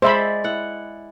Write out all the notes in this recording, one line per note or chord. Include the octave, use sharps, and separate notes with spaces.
G#3 C5 D5 E5 B5
E4 F#5